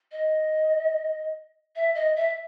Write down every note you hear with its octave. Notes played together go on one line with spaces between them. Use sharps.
D#5
E5
D#5
E5